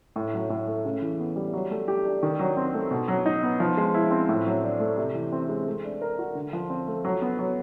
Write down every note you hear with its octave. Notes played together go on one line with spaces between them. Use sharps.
A2
F#3
A2
A3
C#3
E3
B3
G3
F#3
A3
G4
D4
D#3
F#3
C4
A3
B2
F#3
D#4
B3
F3
G#3
E4
C4
A2
F#3
D4
A3
C3
E3
C4
G#3
A3
D4
A#4
F#4
D3
F3
C4
A3
F#3
B3
F#3